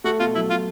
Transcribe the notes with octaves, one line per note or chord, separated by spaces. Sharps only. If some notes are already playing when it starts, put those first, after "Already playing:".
A3 F#4
B2 F4
F#3 E4
B2 F4